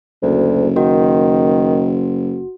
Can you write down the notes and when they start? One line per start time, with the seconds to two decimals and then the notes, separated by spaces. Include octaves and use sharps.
0.22 F#1 D2
0.76 D#3 F#4